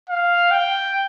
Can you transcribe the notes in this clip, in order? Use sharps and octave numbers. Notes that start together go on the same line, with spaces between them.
F5
G5